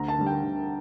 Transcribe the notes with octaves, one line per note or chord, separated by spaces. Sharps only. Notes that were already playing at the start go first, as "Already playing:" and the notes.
Already playing: D2 A#5
A5
D3 G3
G5
D2